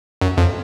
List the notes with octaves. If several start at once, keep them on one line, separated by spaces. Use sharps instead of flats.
F#2
F2